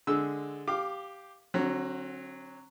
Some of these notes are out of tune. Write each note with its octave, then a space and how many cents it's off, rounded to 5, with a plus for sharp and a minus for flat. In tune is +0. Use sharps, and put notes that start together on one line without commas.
D3 +0 G#3 +0 E6 -10
G4 +0 F5 +0 D6 +25
D3 +0 F#3 +0 C4 +40